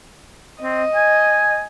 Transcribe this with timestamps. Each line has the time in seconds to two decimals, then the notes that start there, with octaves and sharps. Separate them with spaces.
0.62 C4 D#5
0.95 G#5